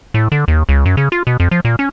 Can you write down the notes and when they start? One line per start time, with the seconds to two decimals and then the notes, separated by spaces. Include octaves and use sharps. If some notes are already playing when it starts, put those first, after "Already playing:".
0.14 A2
0.32 D3
0.48 D#2
0.69 C#2
0.85 F#2
0.97 C#3
1.12 F4
1.27 B2
1.40 F2
1.51 F3
1.65 A#2
1.79 C#4